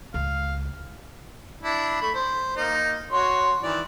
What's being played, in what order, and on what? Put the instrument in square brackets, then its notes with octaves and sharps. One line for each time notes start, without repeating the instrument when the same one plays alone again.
[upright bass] C#2 [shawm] F5
[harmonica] D4 E4
A3 B5
C5
A#3 D#4
F#4 C#5 C6
D#3 E3 D5